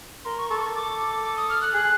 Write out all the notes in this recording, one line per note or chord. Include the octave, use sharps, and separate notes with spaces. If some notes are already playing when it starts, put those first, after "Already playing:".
A#4 C6
C#6
A4 C#6
D6
C#6
D6
D6
D#6
F6
F#6
G#4 F#6